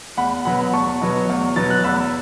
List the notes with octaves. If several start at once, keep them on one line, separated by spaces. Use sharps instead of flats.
E2 F#5 B5
B2 F#3 B3 F#5 B5
E2 A5 C#6
B2 F#3 B3
E2
B2 F#3 B3 A6
F#6
E2 B5 E6